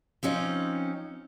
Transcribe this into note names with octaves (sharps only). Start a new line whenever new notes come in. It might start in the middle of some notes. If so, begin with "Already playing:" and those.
F3 C4 C#4 D#4